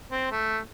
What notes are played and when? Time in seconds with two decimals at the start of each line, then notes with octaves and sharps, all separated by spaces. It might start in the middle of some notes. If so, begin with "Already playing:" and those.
0.11 C4
0.32 A3